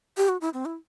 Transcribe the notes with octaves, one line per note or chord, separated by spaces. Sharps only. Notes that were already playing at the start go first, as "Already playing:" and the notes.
G4
F#4
E4
C4
E4